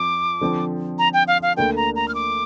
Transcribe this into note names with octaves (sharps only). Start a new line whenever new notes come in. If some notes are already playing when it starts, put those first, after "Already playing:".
Already playing: F2 F3 D6
D3 F3 C4
A#5
G5
F5
F5
D2 D3 A#3 G5
A#5
A#5
F6
D6